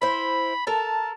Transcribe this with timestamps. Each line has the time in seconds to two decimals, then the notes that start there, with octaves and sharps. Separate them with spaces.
0.02 E4 C5 B5
0.67 A4 A#4 A5